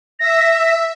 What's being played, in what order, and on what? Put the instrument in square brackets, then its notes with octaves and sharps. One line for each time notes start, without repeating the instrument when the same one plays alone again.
[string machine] E5 [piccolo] A#6